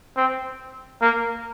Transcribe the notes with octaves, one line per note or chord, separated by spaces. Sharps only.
C4
A#3